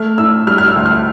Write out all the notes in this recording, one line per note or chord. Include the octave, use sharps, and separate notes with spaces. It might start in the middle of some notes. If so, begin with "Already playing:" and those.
Already playing: A3 F6
A2 E6
G3 F6
F6
E6
D2
F6